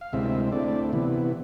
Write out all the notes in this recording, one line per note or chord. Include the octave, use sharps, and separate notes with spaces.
F5
D2 C3 G#3 C4 E4 E5
D3 A3 C4 E4 D5
C3 E3 B3 E4